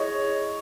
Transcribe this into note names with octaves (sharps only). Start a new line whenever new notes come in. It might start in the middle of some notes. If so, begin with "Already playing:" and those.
Already playing: E4 G#4 C#5 D#5